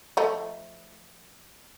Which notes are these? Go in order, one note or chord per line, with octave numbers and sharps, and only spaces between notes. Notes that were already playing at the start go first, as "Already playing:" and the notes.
F3 A3 D#5